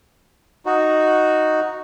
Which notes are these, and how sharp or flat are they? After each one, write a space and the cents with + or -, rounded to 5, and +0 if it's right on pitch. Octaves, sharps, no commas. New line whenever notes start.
D#4 +0 F#4 +0